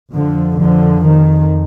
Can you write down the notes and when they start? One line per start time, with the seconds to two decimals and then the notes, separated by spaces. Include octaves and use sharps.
0.13 F2 D3 F3
0.59 D3 F3
1.04 D#3